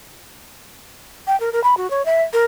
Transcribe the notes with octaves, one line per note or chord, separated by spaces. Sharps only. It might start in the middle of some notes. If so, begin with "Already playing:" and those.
G5
A#4
A#4
B5
F#4
C#5
E5
A#4